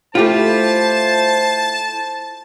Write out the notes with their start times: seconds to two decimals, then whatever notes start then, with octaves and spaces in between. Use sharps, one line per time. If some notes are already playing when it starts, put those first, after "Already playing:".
0.15 A3 E4 F4 G4 C5 A5